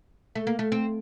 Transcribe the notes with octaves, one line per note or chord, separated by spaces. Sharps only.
A3
A#3
A3
C4